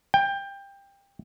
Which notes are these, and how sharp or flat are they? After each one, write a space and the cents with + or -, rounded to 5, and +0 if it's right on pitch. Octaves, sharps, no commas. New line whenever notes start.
G5 +20